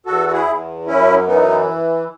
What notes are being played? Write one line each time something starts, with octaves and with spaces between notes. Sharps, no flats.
E2 F#4 A4
F#4
E4 G#4
E2
F#2 C#4 E4
E3 B3 D#4